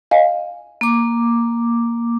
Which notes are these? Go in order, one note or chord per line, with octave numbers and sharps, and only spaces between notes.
D#5 F5 G#5
A#3 D6